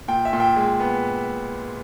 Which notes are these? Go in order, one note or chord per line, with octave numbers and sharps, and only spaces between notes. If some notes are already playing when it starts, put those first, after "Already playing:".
A#2 G5
E5
A#2
G5
G#3
B3